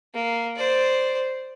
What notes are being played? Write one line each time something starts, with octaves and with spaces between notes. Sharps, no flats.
A#3
C5 D5